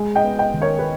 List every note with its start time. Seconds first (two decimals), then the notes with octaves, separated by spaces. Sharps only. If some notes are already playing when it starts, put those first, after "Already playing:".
Already playing: G#3
0.15 D#5 G5
0.23 B3
0.39 D#5 G5
0.54 D#3
0.62 A#4 C#5
0.79 B4